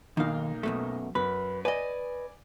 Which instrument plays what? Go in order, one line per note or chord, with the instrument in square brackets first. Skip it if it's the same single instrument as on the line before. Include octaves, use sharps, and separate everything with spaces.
[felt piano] B1 A#3 D#4 [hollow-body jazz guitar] D#3 F5
[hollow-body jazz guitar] F#2 B2 A3
[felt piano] F#2 [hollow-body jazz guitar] B4
[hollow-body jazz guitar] B4 D#5 [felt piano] D5 G#5